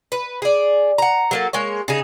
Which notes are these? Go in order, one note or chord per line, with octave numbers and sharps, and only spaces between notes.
B4
G#4 D5
F#5 A#5
F#3 A#3 A4
G#3 A#3 C#5
C#3 D#4 G#4